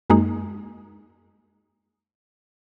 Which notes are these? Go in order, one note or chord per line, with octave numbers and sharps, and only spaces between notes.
F#2 G#3 A#3 D#4